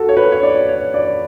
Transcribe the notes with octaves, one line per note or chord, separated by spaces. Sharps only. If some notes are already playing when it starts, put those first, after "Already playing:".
Already playing: F#4 A4
C#5
B4
C#5
D5
C#5
D5